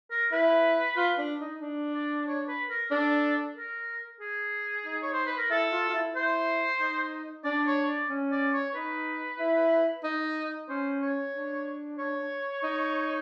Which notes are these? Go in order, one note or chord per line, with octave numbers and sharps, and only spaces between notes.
A#4
E4 B4
F4
D4
D#4
D4
D5
C#5
B4
A#4
D4 A4
A#4
G#4
D#4
C#5
C5
B4
A#4
E4 A4
F4
F4
E4
E4 C5
D#4
D4 D5
C#5
D5
C#4
D5
C#5
D#4 B4
E4
D#4
C#4 C5
C#5
D4
C#5
D#4